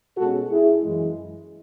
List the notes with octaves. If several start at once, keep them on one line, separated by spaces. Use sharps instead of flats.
B2 G#3 C#4 F#4 A4
E4 G#4
F#2 E3 G#3